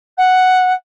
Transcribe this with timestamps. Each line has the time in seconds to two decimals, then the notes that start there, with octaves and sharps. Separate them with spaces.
0.17 F#5